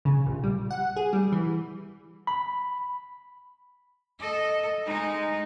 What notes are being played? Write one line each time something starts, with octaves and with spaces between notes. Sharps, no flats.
C#3
A#1
G3
F#5
G#4
G3
E3
B5
A4 D#5
G#3 D#4